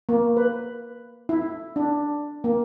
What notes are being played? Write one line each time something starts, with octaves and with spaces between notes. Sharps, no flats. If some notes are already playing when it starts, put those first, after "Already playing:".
A#3
B4
E4
D4
A#3